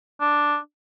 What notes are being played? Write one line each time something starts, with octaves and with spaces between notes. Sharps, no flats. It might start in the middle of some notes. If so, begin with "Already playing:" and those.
D4